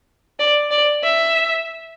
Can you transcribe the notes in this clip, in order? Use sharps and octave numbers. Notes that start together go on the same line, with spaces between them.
D5
D5
E5